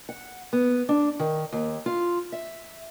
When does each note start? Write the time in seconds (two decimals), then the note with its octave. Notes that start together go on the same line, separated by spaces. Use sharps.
0.09 F#5
0.53 B3
0.89 D4
1.19 D#3
1.52 D#2
1.86 F4
2.32 E5